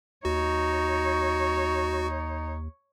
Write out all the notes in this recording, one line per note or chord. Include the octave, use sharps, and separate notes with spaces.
D#2 D#4 F#4 C#5